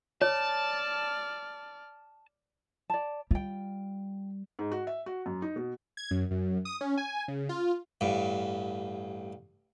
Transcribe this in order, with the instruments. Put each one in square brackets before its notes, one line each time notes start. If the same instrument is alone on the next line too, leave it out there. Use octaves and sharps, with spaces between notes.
[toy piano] C#5 [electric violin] D5 F6 [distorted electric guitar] A5
[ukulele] D5 A5
[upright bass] G3 [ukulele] F4 G5
[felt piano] G#2
F#4
E5
F#4
F#2
D#4
B2
[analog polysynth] G#6
F#2
F#2
D#6
C#4
G#5
C#3
F4
[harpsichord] A1 G2